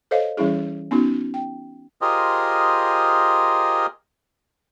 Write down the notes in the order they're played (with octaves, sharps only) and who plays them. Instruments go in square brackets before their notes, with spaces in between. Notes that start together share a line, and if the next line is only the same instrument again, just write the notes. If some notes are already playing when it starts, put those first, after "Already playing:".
[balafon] A4 C5 C#5 D#5 F5
E3 G3 C#4 E4 G#4
B3 C#4 D#4 F#4
G5
[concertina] F4 G4 G#4 A#4 C5 D#5